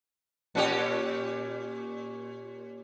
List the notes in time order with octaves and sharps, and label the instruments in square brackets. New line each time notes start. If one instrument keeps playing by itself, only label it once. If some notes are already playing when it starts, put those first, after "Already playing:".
[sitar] A#2 C#4 G4